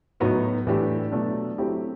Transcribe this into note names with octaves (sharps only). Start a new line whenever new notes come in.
A2 F#3 B3 D#4 F#4
A2 E3 A3 D4 G4
B2 F#3 A3 D4
F#3 A3 C4 E4 G4